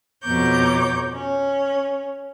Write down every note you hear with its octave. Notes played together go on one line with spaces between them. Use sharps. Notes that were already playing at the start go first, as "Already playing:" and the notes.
F2 B2 C#5 A#5 D6 G6
C#4